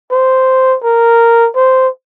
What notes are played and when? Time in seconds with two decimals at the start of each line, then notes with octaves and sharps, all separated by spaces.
0.11 C5
0.83 A#4
1.56 C5